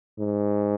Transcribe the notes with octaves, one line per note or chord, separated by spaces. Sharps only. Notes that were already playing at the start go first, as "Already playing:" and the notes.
G#2